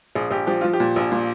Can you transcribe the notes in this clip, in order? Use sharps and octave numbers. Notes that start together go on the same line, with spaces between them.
A#1 G#4
A#1 G4
F3 G4
F3 F4
G4
A#2
A#1
A#2